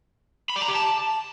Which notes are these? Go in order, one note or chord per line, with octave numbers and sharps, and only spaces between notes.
B5
D5
A#5
G4
A5